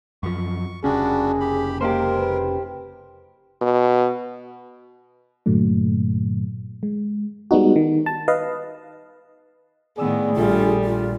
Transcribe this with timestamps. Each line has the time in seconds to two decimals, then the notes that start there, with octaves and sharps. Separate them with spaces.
0.23 F#2 F3 C#6
0.84 F1 C#3 G3 C#4 D4 F#4 G#4
1.40 G4 B5
1.81 G#3 A#3 G4 A#4 C5
2.18 B4
3.61 B2
5.46 G2 A#2 D3 F#3 A3
6.83 G#3
7.51 G3 G#3 B3 D#4 F#4
7.76 D#3
8.06 A5
8.28 B4 D#5 F5
9.98 A2 D#3 B3 G#4 D5 D#6 E6
10.36 A#1 G3 F4 A4
10.84 F4